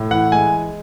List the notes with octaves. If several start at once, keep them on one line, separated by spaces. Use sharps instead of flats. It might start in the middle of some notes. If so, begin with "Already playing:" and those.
Already playing: A2
E3 F#5
G#3 G#5